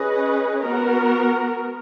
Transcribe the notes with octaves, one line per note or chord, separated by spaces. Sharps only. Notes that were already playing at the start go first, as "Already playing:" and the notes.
Already playing: C#4 G#4 B4 D#5
B3 F#4 A#4